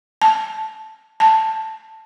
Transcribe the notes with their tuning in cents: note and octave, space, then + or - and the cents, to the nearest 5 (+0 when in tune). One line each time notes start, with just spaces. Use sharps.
A5 -5
A5 +5